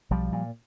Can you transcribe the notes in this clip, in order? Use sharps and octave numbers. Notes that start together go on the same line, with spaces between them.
B1 F3 G3
A#2